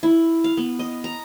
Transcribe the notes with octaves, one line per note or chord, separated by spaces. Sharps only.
E4
F5
B3
D#5
A#5